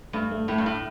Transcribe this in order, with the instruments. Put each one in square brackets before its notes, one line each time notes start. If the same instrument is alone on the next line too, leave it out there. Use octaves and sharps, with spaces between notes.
[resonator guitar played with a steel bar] G2 [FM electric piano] A3
[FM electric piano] A3
[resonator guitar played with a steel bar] A2 [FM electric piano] A3
[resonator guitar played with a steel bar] G2
A2